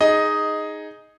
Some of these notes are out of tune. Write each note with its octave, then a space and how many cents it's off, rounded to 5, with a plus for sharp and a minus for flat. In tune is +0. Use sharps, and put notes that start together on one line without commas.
D#4 +0 G#4 +0 D#5 +5